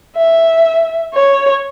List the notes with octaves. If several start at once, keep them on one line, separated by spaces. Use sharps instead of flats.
E5
C#5